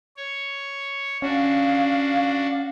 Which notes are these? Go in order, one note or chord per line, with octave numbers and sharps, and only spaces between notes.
C#5
C#4 D4 F#4 F5